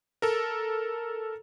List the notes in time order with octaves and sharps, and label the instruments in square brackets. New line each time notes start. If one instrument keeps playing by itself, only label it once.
[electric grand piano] A4 A#4